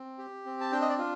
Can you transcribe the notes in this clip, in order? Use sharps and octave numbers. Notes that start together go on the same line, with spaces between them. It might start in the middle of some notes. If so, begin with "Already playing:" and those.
Already playing: C4
G4
C4
A5
D4 G5
D#5
D5
F4